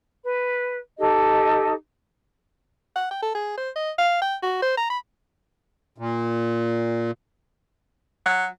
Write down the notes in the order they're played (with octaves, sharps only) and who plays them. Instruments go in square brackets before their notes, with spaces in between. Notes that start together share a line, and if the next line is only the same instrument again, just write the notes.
[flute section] B4
D#4 G4 A4 D#5
[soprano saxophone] F#5
G5
A4
G#4
C5
D#5
F5
G5
F#4
C5
A#5
B5
[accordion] A#2
[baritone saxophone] F#3